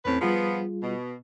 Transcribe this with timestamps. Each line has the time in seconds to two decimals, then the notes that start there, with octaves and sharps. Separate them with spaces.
0.05 E2 A2 C4 C#4 B4
0.21 F3 G3 B3 F4 G#4
0.83 B2